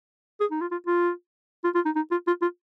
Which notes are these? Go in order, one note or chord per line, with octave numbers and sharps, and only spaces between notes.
G#4
D#4
F4
F4
F4
F4
F4
D#4
D#4
F4
F4
F4